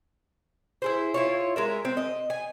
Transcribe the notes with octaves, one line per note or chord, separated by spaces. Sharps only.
E4 G#4 C5
E4 F4 C#5
G#3 A#4 E5
C4
D#5
G#5